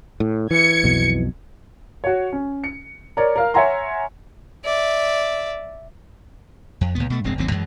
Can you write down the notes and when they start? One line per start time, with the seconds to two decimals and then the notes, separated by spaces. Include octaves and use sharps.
0.20 A2
0.51 E3 G#6 C#7
0.84 B1 F2 B2
2.04 F#4 C#5
2.32 C#4
2.64 C#7
3.17 A#4 C#5 D5
3.36 A#4 F5 F6
3.54 C#5 E5 F#5 G#5 A#5 C6
4.65 D5 E5
6.81 F2
6.95 C#2 A#2 B3
7.10 B2 A3
7.24 E1 G2 G#3 C4
7.38 G#1 D#2 F#3 C4
7.51 F#2 E3 G#3